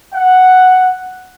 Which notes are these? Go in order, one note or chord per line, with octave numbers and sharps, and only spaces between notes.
F#5